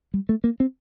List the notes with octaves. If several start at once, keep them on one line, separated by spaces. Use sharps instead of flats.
G3
A3
A#3
C4